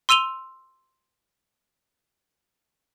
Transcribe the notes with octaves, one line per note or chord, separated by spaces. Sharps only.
C6 E6 D#7 F7 G7